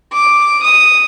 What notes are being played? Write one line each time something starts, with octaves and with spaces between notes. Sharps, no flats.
D6
D#6